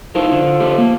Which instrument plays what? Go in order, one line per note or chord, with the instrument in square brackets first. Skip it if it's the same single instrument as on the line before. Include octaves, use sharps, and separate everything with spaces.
[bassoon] F3 [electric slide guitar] D#4 E4 A#4
[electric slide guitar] D3
A3 G4
A#3